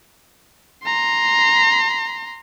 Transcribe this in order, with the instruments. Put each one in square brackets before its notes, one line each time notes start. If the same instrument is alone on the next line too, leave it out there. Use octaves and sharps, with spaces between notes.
[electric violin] A#5 C6